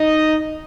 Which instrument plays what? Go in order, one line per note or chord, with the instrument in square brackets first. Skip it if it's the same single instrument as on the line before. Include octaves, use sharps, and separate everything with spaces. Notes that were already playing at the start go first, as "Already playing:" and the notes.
Already playing: [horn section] D#4 D#5